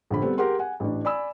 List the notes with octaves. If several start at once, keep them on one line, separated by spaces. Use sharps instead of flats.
A#1 D3 B5
G3 B3 C4 A4
G4 G#4 A#4 F#5 C6
F#5 G#5
A1 D4
D5 G#5 B5 E6